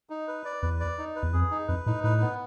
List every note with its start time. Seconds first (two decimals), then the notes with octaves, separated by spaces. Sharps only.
0.10 D#4
0.28 B4
0.45 D5
0.62 E2 B4
0.80 D5
0.98 D#4
1.16 B4
1.23 E2
1.33 F2 G#4
1.51 D#4
1.68 F2 B4
1.86 A2 D#4
2.04 A2 B4
2.21 B3